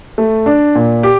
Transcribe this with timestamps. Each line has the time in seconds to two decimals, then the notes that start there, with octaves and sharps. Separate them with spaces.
0.18 A3
0.46 D4
0.75 A#2
1.03 G4